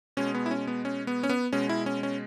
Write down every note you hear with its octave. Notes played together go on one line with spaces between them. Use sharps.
B2 G#3 C#4
B3
E4
C#4
B3
C#4
B3
C#4
B3
B2 G#3 C#4
E4
C#4
C#4